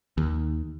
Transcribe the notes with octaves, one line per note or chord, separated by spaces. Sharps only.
D#2